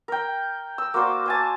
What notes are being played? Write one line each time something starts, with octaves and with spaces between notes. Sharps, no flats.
A#4 G5
E6
A#3 F#4 C5 D5
C5 G#5 A5